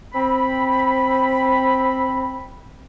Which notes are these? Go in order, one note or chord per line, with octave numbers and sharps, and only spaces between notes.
C4 B5